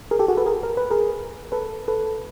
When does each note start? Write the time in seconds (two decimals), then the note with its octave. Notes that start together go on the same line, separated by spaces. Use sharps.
0.11 G#4 A#4
0.19 G4 A4
0.28 F#4 G#4
0.37 A4 B4
0.46 G#4 A#4
0.63 A#4
0.77 B4
0.91 G#4 A#4
1.52 A4 B4
1.88 A4 B4